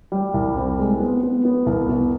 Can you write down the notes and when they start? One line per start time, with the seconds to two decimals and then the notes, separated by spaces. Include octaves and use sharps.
0.12 G3
0.34 C2
0.56 C4
0.79 G#3
1.00 B3
1.23 B3
1.45 B3
1.66 C2
1.89 B3